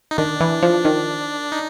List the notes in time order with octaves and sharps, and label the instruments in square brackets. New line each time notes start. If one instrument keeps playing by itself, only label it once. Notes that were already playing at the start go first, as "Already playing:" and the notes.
[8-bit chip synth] D#4
[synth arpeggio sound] D#3 [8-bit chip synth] D4
[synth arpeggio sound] E3
F3
D#3
[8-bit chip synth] D#4